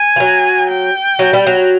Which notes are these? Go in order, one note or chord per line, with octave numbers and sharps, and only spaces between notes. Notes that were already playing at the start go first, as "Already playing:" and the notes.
Already playing: G#5
F3
F#3
G5
F#3
G3
F#3